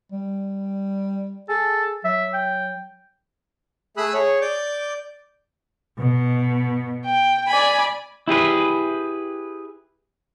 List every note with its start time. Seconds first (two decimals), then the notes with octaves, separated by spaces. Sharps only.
0.12 G3
1.49 G#4 A4
2.05 F#3 E5
2.34 G5
3.97 A3 G#4 B5 D#6 E6 F#6
4.14 G#4 C#5
4.42 D5 D6 G6
5.98 B2
7.04 G5
7.47 D5 G#5 B5
8.28 E4 G4 G#4 B4